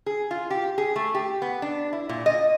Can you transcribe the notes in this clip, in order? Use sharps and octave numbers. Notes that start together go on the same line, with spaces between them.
G#4
F4
G4
G#4
A3
G4
B3
D4
E4
A#2
D#5